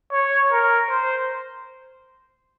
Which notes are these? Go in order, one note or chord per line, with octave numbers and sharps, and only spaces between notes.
C#5
A#4
C5